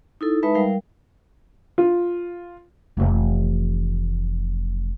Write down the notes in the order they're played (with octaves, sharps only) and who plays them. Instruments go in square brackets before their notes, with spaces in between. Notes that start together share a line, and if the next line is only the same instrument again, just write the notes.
[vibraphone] D#4 E4 A4
G#3 D#4 B4 E5 A5 B5
G3 A#4 F5 G5
[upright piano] F4
[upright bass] F1 E3